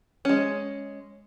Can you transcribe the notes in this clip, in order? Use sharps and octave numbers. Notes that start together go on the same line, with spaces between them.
G#3 C#4